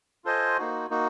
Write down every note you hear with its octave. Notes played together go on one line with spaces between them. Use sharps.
F4 A4 C5 D#5 G#5
A#3 D#4 F#4
A#3 D#4 F#4